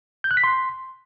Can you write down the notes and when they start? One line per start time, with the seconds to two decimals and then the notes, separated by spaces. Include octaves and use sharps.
0.24 G6
0.31 F#6
0.37 B6
0.44 C6